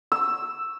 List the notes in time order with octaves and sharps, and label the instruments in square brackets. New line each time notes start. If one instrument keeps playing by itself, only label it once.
[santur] E6